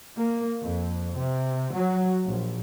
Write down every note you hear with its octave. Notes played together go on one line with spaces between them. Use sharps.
A#3
F2
C3
F#3
A#1